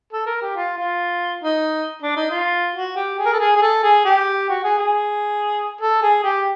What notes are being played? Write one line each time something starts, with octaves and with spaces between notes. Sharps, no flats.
A4
A#4
G4
F4
F4
D#4
D4
D#4
F4
F#4
G4
G#4
A#4
A4
G#4
G#4
A4
G#4
G4
F#4
G#4
G#4
A4
G#4
G4